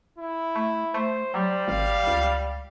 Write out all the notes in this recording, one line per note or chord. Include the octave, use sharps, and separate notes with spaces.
E4
A3
A3 C5
F#3 G3 C5
G#1 F5
C#2